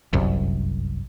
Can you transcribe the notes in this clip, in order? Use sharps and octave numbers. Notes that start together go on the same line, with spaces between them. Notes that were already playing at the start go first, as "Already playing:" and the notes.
G1 C2 F#2